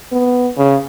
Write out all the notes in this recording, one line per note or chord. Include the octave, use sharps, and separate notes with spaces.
B3
C#3